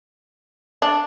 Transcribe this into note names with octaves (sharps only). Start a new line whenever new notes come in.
D4